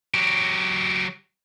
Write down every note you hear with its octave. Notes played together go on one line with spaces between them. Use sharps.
F#3 G4